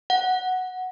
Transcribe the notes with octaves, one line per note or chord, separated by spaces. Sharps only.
F#5